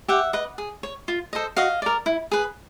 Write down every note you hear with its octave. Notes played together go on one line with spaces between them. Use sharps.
G4 E5 F#5
B4 D#5
G#4
C#5
F4
A4 C5 D#5
F#4 D#5 F5
A#4 D5
E4
G#4 B4